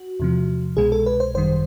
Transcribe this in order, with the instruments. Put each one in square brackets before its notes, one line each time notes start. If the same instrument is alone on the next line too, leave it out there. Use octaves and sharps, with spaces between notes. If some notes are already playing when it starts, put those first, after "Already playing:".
Already playing: [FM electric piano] F#4
E2 C3 F3
C2 B2 G#3 G#4
A4
B4
C5
G#1 F#2 D#3 G3 C5